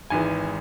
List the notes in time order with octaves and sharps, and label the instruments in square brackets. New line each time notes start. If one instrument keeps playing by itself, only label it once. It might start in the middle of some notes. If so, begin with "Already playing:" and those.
[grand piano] G#1 G#2 E3 G#5